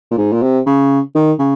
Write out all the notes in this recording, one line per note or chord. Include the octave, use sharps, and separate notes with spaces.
A#2
G#2
A#2
C3
C#3
D#3
C#3